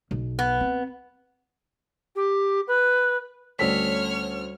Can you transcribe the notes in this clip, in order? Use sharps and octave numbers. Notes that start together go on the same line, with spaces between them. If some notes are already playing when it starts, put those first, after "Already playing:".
B1
B3
C4
G4
B4
D2 G3 C#4 A4 C#5 D5 F6 B6